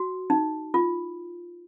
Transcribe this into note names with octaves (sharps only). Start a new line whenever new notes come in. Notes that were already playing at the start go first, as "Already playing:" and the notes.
Already playing: F#4
D#4
F4